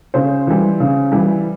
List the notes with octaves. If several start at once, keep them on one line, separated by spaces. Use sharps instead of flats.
C#3 C5
E3 G3
C#3
E3 G3